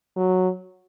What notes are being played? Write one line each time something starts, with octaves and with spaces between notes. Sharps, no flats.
F#3